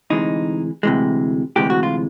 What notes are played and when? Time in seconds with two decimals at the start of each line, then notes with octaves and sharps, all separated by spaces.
0.10 D2 C3 E3 G#3 D#4
0.83 D2 C3 E3 G#3
1.56 D2 C3 E3 G#3 G4
1.70 F#4
1.83 F4